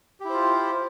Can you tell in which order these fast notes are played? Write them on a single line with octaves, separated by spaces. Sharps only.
G4 E4 C5 F4